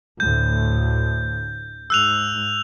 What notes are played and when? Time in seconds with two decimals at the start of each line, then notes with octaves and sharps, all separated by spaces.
0.20 D2 A2 G6
1.90 G#2 E6 F#6 F7